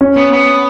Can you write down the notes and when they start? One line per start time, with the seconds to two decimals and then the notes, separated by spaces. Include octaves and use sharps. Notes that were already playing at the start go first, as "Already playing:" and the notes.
0.01 C#4
0.17 B3
0.32 B3